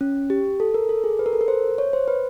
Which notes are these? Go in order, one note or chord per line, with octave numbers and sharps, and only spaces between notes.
C#4
G4
A4
A#4
A4
G#4
B4
A#4
A4
A#4
C5
C#5
C5
B4